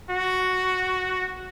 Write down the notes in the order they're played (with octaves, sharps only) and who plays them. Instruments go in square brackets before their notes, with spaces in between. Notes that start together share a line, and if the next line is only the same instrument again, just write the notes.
[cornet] F#4